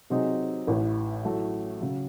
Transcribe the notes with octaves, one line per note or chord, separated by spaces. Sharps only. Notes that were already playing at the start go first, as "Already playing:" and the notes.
C3 F#3 C4 D#4 G#4
A1 A2 E3
A2 F#3 A3
C#3 F#3